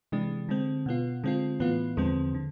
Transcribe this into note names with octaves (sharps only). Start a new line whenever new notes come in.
C3 E3 G#3 D4
D3 G#3 C4
B2 B3 F4
D3 G#3 C4 F4
A2 E3 B3 F4
E2 D3 F3 G#3 C4
D3